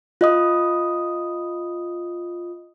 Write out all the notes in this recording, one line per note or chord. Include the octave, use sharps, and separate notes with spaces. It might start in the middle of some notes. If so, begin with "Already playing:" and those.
F4 D#5 D#6